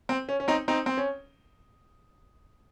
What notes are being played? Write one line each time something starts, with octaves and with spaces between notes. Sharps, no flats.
C4
C#4
C#4
C4 D#4
C4 D#4
C4
C#4